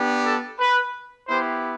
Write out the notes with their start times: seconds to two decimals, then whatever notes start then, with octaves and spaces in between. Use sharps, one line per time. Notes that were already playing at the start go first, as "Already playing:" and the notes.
Already playing: B3 D4 G4
0.25 A4
0.59 B4
1.28 B3 E4 G4 C5